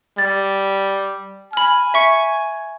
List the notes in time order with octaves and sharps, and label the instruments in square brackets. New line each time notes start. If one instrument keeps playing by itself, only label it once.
[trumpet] G3 [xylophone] A6
[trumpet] G#5 [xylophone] B5 F6
[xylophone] E5 C#6 C#7